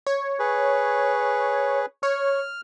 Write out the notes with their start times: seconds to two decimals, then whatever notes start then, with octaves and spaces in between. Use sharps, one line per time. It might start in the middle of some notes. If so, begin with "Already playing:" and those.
0.07 C#5
0.39 G#4 B4
2.03 C#5 F6